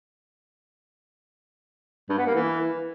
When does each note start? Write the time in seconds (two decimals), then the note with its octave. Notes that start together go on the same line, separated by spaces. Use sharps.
2.09 G2
2.18 B3
2.26 A#3
2.34 E3